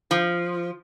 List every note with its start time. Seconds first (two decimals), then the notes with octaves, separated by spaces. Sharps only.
0.11 F3